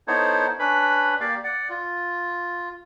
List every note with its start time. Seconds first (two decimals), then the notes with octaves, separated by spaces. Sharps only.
0.08 B3 D#4 E4 A4 C5 C#5
0.59 C#4 D4 B4 B5
1.20 A#3 G4 D5 F5
1.44 D5 F#5
1.70 F4